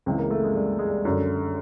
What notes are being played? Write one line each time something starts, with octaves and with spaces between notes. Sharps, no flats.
C#2 C#3 E3 C4
A#3
A3
G#3
G3
G#3
G3
F#2 D3